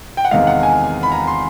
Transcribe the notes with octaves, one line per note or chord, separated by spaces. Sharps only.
G5
F#5
E2 C3 D#3 G#3 F5
F#5
G#5
B5
A#5
C6